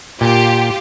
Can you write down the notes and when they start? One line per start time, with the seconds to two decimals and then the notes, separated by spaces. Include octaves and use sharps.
0.21 A#2 F4 G4